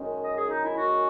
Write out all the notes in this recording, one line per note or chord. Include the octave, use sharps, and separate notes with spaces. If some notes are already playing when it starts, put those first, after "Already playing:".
Already playing: F#2 D#3 G#3 C#4
D#5
G#4
D#4
E4
F#4